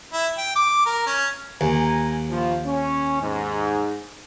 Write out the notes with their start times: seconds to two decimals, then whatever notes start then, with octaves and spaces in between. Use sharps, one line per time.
0.13 E4
0.38 G5
0.56 D6
0.86 A#4
1.07 C#4
1.61 D#2 G#5 A#5
2.30 A#1 F3
2.66 C#4
3.22 G#2